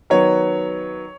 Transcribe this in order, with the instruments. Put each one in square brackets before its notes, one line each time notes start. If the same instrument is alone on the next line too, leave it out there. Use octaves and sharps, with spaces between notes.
[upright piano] D#3 F#3 B3 C#5